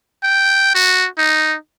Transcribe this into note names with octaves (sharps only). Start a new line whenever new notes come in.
G5
F#4
D#4